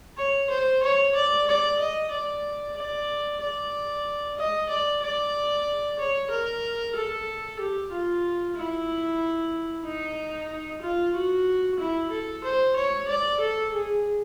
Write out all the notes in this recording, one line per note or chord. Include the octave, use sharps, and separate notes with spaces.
C#5
C5
C#5
D5
D5
D#5
D5
D5
D5
D#5
D5
D5
C#5
A#4
A4
G4
F4
E4
D#4
F4
F#4
E4
A4
C5
C#5
D5
A4
G#4